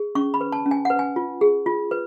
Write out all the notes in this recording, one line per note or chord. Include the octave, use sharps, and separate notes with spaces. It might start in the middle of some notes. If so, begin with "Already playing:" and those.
Already playing: G#4
C#4 C#6
B5
B4
A5
C#4
G#5
B4 F#5
G#5
F4
G#4
F4
B4